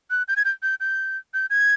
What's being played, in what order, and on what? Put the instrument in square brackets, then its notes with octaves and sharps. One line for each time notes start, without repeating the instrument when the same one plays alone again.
[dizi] F#6
G6
G#6
G6
G6
G6
G6
G#6